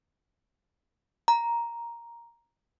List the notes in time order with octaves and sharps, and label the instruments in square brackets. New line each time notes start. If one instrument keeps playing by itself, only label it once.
[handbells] A#5